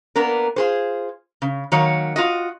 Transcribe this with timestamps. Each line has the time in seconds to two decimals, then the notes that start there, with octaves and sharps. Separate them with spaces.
0.16 A#3 B3 D4 A#4
0.56 F4 G#4 C5
1.42 C#3
1.72 D#3 F#3 A#3 C#5
2.16 F4 F#4 D#5